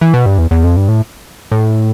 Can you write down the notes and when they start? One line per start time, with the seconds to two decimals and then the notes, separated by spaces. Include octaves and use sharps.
0.01 E3
0.14 B2
0.26 G2
0.38 E2
0.51 E2
0.64 F2
0.76 G2
0.88 A2
1.51 A2